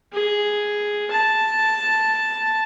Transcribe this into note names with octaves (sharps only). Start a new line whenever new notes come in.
G#4
A5